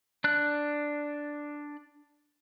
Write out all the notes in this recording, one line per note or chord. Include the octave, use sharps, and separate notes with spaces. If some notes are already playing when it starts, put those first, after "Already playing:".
D4 F#6